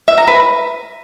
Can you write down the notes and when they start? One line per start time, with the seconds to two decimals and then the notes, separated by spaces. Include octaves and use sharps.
0.08 E5
0.18 A#5
0.27 B4